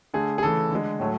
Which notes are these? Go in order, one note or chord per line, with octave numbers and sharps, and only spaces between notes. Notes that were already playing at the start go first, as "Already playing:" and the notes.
D3 A3 G#4
G#4
C#3 E3 A3 A4
D3 G#3
A2 F#3 A3